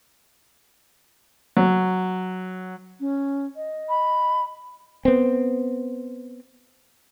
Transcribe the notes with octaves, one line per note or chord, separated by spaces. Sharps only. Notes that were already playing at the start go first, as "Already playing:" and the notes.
F#3
C#4
D#5
B5
B3 C4